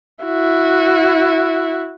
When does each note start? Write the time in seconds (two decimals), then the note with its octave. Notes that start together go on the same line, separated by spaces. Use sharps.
0.25 E4 F#4